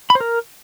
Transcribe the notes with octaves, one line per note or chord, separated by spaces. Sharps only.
B5
C5
A#4